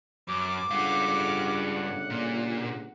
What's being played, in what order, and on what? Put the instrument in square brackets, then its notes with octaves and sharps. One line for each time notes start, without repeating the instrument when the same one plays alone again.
[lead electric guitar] F#2 [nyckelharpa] D6
[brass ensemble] G1 C#3 F#5 [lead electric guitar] G2 F5
[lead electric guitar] A#2